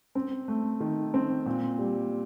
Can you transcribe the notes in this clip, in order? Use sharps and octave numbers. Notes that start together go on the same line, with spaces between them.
C4
A3
D#3
C4
A#2
G3